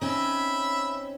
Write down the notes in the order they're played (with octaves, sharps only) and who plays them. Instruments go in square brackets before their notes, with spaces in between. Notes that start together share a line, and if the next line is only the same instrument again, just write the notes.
[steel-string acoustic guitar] C4 C#4 D#4 [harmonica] E5 B5